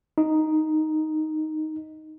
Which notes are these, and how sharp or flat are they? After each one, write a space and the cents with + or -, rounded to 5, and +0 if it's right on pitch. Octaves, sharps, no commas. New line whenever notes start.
D#4 +0